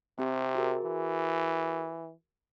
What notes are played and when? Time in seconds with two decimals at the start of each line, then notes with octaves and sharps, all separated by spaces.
0.19 C3 C4 G4
0.55 F#4 G#4 A#4
0.84 E3